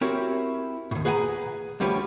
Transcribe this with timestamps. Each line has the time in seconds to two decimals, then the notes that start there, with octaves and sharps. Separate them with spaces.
0.01 C4 E4 F#4 G4 A#4 C#5
0.91 D#2 A2
1.05 G#4 B4 F5 G5 G#5 A#5
1.80 D2 F3 G3 C#4 G4 B4